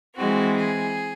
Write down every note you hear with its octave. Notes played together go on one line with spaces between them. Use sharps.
E3 G#3 C4 F#4
G#4